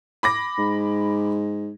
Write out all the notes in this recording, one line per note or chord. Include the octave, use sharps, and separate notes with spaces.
B5 D6 A#6
G#2